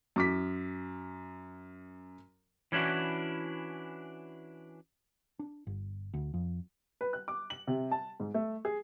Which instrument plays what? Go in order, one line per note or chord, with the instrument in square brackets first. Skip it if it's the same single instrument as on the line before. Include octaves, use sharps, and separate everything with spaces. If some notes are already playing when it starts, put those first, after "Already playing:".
[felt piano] F#2 D6 B6
[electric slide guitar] E3 C#4 D4 E4 F#4
[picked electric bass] D4
G1
D2
F2
[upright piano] B4
F#6
D6
F#7
C3
A5
G#2
A3
G#4